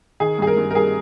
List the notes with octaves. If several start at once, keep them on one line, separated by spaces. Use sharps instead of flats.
D#3 G#4
G2 G#4
A#4
G2
A#4
G3 G#4